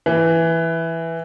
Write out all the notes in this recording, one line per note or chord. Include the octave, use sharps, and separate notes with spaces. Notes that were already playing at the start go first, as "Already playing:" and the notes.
E3